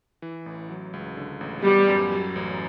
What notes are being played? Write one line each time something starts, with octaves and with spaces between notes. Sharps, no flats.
E3
A1
F#3
C#2
D3
A1
G3 B3
F#2
F#3
A1